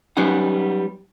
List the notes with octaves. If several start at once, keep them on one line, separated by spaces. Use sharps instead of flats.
F#3 G3 B3 C#4 D#4 F#5